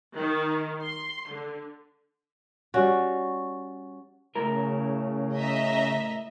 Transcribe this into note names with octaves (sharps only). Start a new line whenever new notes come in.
D#3
C6
D3
G3 C#4 F#4
A2 C#3 E4 A#4
D#5 E5 A#5